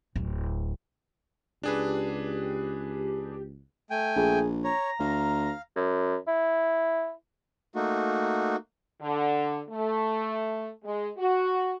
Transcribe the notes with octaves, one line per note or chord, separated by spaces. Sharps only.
D1
C#2 D4 G4 G#4 B4
A3 G5 G#5
A#1 G#4
C#5 A#5
D2 F5
F#2
E4
A3 A#3 D#4 F#4
D3
A3
G#3
F#4